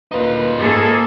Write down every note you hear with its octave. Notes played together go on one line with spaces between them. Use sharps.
D2 A#2 D#4 F4 B4
G#2 A#3 G#4 A4